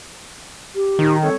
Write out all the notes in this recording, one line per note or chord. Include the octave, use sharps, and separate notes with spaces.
G4
A#2 D#3 D#4
G3 C4 A4 C#5